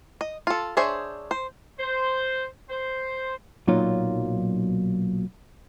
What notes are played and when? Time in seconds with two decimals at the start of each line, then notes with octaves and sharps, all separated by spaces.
0.21 D#5
0.47 F4 A4
0.77 D4 G#4 C5 C#5 E5
1.31 C5
1.78 C5
2.69 C5
3.67 B1 A#2 F#3 D#4 F4